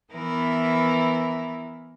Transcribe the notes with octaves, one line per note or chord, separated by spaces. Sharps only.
E3 B3 E4 A#4